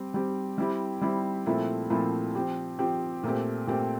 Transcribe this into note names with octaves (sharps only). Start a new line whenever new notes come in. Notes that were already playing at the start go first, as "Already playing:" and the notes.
Already playing: G3 C4 G4
G3 C4 G4
G3 C4 E4 G4
G3 C4 E4 G4
A#2 F3 A3 C4 E4
A#2 F3 A3 C4 E4
F3 C4 G4
F3 C4 G4
A#2 A3 C4 G4
A#2 A3 C4 G4